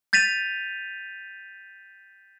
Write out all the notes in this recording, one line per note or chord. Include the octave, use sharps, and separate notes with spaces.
G6 A6 B6 D#7 F7